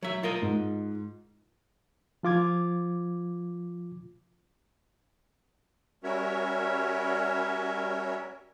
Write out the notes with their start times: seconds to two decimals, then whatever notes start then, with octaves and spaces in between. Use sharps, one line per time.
0.02 F#3 E5
0.23 F4 A#4 D#5
0.42 G#2
2.23 F3 F4 D6 G#6
6.03 G3 C#4 F#4 A#4 C#5 E5